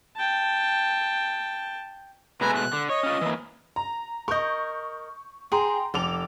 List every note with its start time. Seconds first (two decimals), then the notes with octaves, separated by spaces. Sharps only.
0.17 G5 A5
2.41 B2 G#3 A3 B4 G#5 A#5
2.55 F#6
2.73 D3
2.90 C#5 D#5
3.03 C#4 F4
3.21 E3 A#3
3.76 A#5
4.28 A#4 D#5 C#6 G6
5.52 G#4 G5 A#5 C6
5.94 F1 A4 D6 F7